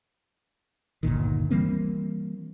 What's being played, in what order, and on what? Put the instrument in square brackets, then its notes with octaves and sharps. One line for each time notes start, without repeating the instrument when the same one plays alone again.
[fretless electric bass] G1 D2 A#2 D#3
E3 G3 A#3 C4